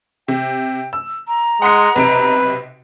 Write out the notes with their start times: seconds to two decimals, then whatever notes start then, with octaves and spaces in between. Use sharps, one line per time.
0.28 C3 G5
0.93 E6
1.28 A#5
1.62 G#3 F#5 C6 C#7
1.96 B1 C3 B4 D7